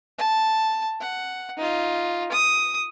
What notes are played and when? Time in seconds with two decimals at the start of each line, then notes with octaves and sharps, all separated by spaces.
0.18 A5
1.00 F#5
1.57 D#4 F4
2.32 D#6